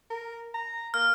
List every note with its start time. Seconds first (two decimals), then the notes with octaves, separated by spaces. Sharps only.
0.10 A#4
0.54 A#5
0.94 A#3 F6